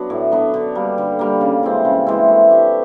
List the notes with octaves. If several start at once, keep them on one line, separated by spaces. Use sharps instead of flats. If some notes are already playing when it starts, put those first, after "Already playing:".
Already playing: F#3 B3 D4
A2
F#3 B3 D4
D3
G3 A#3
D3
G3 A#3
C#3
E3 G#3 C4
C#3
E3 G#3 C4
A3
D4 G4